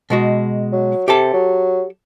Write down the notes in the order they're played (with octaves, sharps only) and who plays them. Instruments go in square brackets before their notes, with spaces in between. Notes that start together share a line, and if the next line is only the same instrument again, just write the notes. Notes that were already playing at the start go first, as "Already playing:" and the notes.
[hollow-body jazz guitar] B2 G#3 F#4
[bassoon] F#3
[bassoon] C3 [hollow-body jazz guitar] G4 A4 A5
[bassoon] F#3